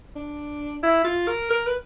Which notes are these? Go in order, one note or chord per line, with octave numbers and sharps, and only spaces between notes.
D4
E4
F4
A#4
A#4
B4